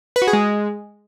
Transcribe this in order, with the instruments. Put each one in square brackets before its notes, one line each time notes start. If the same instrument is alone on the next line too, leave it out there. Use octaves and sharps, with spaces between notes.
[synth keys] B4
F#4
G#4
G#3